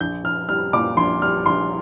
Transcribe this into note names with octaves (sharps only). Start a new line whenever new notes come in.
A#1 G6
A#1 F6
G3 F6
A#2 D6
A#1 C6
G3 F6
A#1 C6